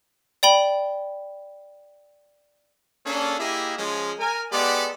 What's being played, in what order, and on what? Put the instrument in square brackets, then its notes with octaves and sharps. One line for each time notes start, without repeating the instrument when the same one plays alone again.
[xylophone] D5 G5 B5 G7
[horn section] A#3 C#4 D4 G#4 A4
A#3 E4 G4 G#4 D#5 E5
F3 G#3 C#4
A#4 G#5
G#3 B3 G4 A4 D5